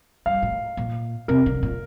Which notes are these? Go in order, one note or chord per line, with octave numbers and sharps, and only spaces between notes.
G2 F5
A2
A#2
C3 A#4
D3
A#2